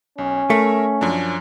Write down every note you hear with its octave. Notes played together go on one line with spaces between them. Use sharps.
B1 C#4
A3 A#4 E5
F#2 F3 D4